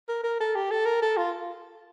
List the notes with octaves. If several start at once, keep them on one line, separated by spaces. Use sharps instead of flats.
A#4
A#4
A4
G4
A4
A#4
A4
F4